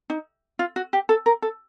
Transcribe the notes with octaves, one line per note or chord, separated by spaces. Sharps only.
D#4
F4
F#4
G4
A4
A#4
A4